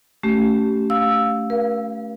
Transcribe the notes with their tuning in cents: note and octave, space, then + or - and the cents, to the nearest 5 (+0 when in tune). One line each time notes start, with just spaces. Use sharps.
A3 +0 C#4 +15 G4 -25
F5 +15 E6 +0
A#4 +45 F5 -25